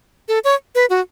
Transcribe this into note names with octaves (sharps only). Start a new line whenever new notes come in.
A4
C#5
B4
F#4